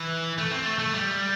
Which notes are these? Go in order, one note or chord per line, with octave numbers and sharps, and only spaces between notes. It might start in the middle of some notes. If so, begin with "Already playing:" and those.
Already playing: E3
A3
C4
A3
A3
G3